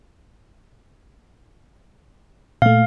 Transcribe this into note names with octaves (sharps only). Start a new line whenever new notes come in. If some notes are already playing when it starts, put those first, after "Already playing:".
A#2 A3 F5